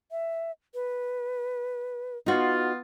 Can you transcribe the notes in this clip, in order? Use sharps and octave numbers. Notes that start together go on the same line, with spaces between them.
E5
B4
B3 D#4 F4 F#4